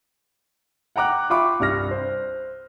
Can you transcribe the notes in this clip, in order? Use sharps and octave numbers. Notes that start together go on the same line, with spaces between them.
F#5 G5 A#5 D6 F#6
F4 E5 G5 B5 C#6 D6
C2 G2 F6 A#6
C5